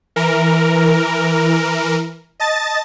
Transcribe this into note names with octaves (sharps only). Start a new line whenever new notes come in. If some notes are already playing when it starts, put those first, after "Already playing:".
E3 A#4
D#5 A5 A6